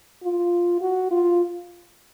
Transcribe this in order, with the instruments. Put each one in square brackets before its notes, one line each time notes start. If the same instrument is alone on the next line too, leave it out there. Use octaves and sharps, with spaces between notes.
[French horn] F4
F#4
F4